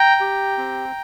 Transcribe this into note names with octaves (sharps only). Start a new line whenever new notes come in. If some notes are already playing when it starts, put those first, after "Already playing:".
Already playing: G5 A#5
G4
C4